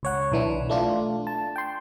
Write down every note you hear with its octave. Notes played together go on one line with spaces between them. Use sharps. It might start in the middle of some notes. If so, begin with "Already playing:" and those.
C#2 C#5 F#5
B1 E3 D4
A3 D4 F4
A5
G5 C6